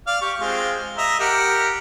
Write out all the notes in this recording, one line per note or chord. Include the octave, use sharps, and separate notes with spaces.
D5 F5
G4 C#6
G#3 C4 F4
D#5 E5 A#5
G4 A#4 F#5